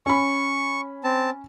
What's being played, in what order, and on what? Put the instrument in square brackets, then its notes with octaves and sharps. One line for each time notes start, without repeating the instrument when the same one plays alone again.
[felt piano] C#4 B5 [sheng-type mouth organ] C#6
[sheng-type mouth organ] C4 A5